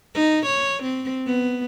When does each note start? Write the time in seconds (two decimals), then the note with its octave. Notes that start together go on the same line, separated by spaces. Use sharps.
0.15 D#4
0.46 C#5
0.83 C4
1.27 B3